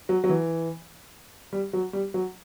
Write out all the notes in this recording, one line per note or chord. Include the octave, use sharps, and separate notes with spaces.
F#3
F#3
E3
G3
F#3
G3
F#3